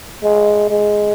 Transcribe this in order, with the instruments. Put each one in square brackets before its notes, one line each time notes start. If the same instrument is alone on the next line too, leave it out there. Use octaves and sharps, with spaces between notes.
[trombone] G#3
G#3